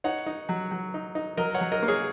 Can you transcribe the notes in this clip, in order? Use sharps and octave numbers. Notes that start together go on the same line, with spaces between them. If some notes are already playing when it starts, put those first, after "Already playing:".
D#4 C#5 F#5
D#4
F#3
F#3
D#4
D#4
F#3 A#4 D#5
C#5 F#5
F#3
A#4 D#5
A#3
G#4 C#5